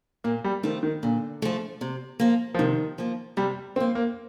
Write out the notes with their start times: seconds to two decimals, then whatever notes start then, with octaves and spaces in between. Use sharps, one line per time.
0.24 A#2 A#3
0.44 G3
0.63 D#3 F3 A3
0.83 D#3
1.03 A#2 D3
1.42 F3 A3
1.81 C3
2.20 F3 A#3
2.54 F3
2.59 C3 D#3
2.98 F3 A#3
3.37 C3 G3
3.76 F3 A#3 C4
3.95 A#3